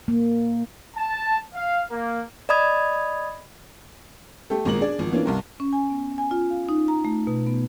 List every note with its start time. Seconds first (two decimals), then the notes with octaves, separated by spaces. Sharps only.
0.08 A#3
0.96 A5
1.54 F5
1.91 A#3
2.49 D5 D#5 B5 D#6 G#6
4.50 A3 G4 A4
4.65 G#1 A#2 G#3 A#4 F#7
4.81 D4 G#4 D5
4.99 G#1 F3
5.12 E3 A#3 C#4 D4 F4
5.26 C2 G2 A#4
5.60 C#4
5.73 G#5
5.90 B3
6.18 G#5
6.31 F4
6.50 F5
6.69 D#4
6.88 A#5
7.05 A3
7.27 B2
7.47 B3